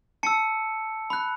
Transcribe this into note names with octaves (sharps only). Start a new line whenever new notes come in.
A5 E6 C#7
B5 F#6